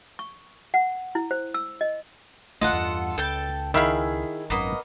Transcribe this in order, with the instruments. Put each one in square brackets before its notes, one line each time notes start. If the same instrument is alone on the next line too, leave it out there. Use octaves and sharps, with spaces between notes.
[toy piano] C#6
F#5
E4
C5
E6
D#5
[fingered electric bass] A1 D2 A3 [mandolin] F4 A4 F#5 [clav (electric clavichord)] D#5
[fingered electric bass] E2 G2
[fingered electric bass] C#2 [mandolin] A4 G5 A5
[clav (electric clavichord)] D#3 E5 F5 [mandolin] E4 G#4
[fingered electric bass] G#1 F#2 [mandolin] A#3 B3 D#5